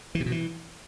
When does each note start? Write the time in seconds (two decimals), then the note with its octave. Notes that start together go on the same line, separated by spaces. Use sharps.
0.15 E3
0.20 C3
0.26 B2
0.32 E3